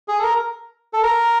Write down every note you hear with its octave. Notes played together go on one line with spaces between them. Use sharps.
G#4
A4
A#4
A4
A#4